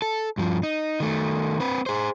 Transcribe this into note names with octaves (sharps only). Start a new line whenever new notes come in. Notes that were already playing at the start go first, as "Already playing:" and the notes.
A4
G2 F3
D#4
D#3 A3
C4 B4
G#4 C5